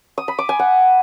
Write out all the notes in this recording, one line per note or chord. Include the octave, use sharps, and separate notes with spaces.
D#6
B5
D6
G#5
F#5